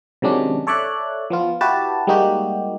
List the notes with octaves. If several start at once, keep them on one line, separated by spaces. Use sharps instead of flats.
C3 D#3 F#3 G#3 C#4 D4
A4 C#5 D5 E5 F#6
F3 B3 F4
E4 F#4 G4 B4 A5
G3 G#3 A#3 D#4 F#4 G4